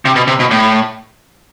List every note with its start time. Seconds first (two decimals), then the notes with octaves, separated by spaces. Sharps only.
0.05 C3
0.16 B2
0.27 C3
0.40 B2
0.51 A2